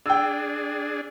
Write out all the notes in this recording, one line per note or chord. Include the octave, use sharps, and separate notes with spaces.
D4 G#4 G5 E6